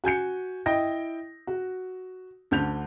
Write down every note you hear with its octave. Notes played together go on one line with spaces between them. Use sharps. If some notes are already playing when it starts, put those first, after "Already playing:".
F#4 G#5 G6 C#7
E4 D#5 G5 A#6
F#4
D2 D3 G6 F7